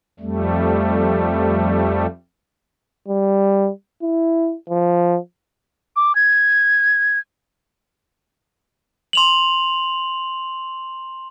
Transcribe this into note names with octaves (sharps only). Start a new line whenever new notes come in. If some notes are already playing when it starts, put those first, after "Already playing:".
F2 G3 A3
G3
E4
F3
D6
G#6
C6 F7 F#7